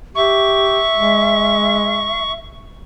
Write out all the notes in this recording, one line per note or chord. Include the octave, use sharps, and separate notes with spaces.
G4 E5 C#6
G#3